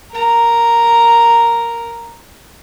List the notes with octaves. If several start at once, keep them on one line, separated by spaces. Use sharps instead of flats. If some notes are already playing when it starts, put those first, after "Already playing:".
A#4 A#5